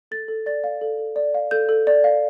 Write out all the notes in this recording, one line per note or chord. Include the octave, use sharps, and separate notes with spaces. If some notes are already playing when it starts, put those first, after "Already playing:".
A4 A6
A4
D5 A6
F5
A4
A4
D5
F5
A4 G6
A4
D5
F5